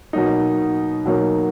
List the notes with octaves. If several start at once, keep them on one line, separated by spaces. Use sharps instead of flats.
B2 F#3 A#3 D#4
B2 F#3 A#3 D#4